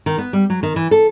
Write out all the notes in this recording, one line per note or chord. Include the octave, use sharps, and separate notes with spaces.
D#3
B3
G3
F#3
D#3
E3
A4